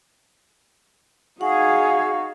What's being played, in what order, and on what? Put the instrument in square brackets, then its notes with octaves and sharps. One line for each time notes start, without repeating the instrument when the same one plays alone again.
[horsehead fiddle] D#4 F5 [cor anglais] F#4 [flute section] G#4 [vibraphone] F#5